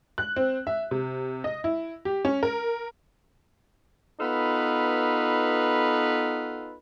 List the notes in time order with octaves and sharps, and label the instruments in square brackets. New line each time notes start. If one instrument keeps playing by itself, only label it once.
[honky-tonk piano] F#6
C4
E5
C3
D#5
E4
G4
C#4
A#4
[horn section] B3 D#4 F4 A4 B4